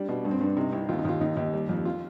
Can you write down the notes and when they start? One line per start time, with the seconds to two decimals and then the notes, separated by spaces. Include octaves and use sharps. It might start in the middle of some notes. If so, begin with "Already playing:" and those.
Already playing: G3 D4
0.09 B2
0.25 G2
0.31 C4
0.41 G2 D4
0.57 C3 D#4
0.73 C2
0.89 D#2 F4
0.99 D#4
1.05 D#2 F4
1.21 D#2 D#4
1.37 D#2
1.53 G3
1.69 F2
1.85 F4